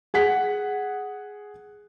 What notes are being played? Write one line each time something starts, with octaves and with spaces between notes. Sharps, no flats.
G#4 F#5 B6